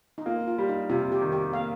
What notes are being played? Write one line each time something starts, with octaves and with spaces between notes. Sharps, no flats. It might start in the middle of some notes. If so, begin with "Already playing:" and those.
D#4
A#3 F4
F4
G3
D#4
C3 F4
G4
D#3
G4
A#3 F5